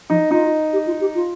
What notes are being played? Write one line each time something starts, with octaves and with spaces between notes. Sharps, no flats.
F3 D#4
D#4 F4
G4
F4
G4
F4